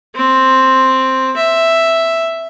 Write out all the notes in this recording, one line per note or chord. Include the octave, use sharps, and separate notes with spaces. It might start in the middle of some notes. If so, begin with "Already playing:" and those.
C4
E5